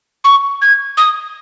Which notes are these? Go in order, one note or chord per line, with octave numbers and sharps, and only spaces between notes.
C#6
G#6
D#6